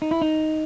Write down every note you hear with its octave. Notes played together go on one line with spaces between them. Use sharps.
D#4
E4
D#4